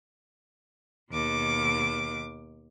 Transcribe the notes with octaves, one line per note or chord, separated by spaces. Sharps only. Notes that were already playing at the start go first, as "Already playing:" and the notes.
D#2 B2 D6